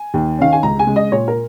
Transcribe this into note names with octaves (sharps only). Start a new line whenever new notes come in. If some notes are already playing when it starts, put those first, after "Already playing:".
Already playing: G#5
D#2
D#3 C#4 F5
G#5
C#2 A#5
G#5
C#3 G#3
D#5
A#2 C#5
A#4